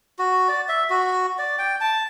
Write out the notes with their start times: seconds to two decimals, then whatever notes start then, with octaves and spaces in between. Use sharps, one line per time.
0.19 F#4
0.49 D5
0.69 E5
0.90 F#4
1.39 D5
1.59 G5
1.81 A5